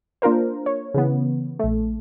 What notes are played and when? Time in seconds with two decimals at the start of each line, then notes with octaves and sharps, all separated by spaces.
0.22 A#3 D4 F4 A#4 C5
0.66 C#5
0.94 C#3 E3 B3
1.59 A#1 A3